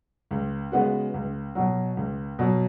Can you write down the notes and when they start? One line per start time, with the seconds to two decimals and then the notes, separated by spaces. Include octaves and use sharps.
0.31 C#2
0.72 C#3 G#3 B3 F#4
1.14 C#2
1.55 B2 F#3
1.97 C#2
2.39 B2 F#3